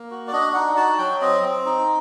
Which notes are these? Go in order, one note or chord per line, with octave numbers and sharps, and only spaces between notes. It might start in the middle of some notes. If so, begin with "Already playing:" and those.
Already playing: A#3
F#4
D5
D4 D#5
D#4 F#5
F#4 A5
F#3 G5
C4 D#5
C4
D#4